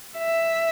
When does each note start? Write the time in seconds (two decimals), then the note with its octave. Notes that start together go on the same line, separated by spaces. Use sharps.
0.19 E5